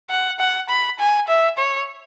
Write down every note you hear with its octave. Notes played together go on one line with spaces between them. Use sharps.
F#5
F#5
B5
G#5
E5
C#5